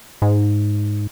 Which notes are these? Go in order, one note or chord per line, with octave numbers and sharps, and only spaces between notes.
G#2